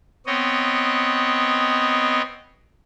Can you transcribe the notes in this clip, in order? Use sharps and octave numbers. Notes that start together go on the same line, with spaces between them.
B3 C4 C#5 D#5